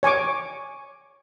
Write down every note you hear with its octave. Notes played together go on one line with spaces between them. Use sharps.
C#5 G#5 C#6 D6